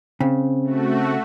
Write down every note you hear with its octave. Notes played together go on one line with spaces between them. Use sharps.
C#3 C4
A3 F#4